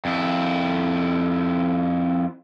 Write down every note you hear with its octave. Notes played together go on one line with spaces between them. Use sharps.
F2 E4